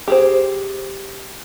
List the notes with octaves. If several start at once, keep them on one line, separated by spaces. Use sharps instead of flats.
G4 G#4 C5